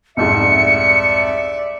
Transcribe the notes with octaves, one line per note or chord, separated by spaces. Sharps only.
C2 F2 G#2 D5 E5 C#7